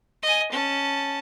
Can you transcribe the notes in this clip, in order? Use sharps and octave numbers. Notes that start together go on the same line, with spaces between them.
D#5 G#5
C#4 A5